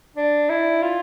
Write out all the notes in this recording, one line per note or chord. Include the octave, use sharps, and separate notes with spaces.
D4
E4
F4